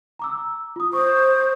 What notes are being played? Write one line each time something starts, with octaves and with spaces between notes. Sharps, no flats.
A#5 D6 E6
F4 D#6
C5 C#6 D#6